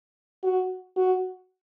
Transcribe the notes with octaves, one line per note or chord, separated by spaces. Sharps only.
F#4
F#4